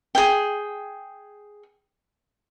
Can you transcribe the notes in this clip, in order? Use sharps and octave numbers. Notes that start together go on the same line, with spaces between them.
G#4 G5